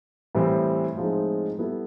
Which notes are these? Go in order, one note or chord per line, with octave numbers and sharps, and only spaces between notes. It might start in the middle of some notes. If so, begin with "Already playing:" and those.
A2 E3 G3 C4
A2 F3 G#3 C4 D#4
G3 B3 E4 A4